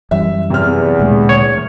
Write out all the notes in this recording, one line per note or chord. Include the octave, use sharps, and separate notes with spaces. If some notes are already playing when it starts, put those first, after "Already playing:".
F#2 E3 G3 E5
E2 C3 F6
D2 A#2 G#3
C#5